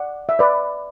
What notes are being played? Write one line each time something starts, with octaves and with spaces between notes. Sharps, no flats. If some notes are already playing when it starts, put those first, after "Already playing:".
Already playing: D5 F#5
E5
B4 D5